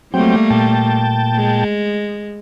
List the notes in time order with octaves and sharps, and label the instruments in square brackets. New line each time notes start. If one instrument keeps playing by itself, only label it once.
[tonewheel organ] F#3 C4 G5 [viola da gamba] G3 A3 A#3
[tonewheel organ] A#2 G5 A5
[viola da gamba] G#3